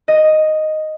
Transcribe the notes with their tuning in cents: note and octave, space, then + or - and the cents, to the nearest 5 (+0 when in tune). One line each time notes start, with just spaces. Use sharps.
D#5 +0